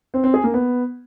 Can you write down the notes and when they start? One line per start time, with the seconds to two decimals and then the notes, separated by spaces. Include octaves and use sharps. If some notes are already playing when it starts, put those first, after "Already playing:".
0.14 C4
0.24 C4
0.34 G#4
0.44 A#3
0.54 B3